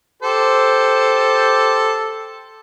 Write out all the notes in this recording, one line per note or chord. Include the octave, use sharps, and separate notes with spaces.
G4 A4 C5